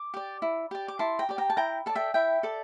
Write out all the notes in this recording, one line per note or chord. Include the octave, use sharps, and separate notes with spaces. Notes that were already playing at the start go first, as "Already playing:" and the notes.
Already playing: D6
G4 D5
E4
G4 D5
D6
E4 A5 C6
G5 A#5
G4 D5
G5 A#5
A5
E4 G5 A#5
A4 D5 A5
E5 G5
E4 E5 G5
A4 D5